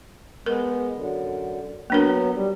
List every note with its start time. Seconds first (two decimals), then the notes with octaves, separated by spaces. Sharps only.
0.46 G#3 B3 A#4
0.95 F#2 D3
1.90 F#3 A#3 B3 D4 A#4
2.34 G3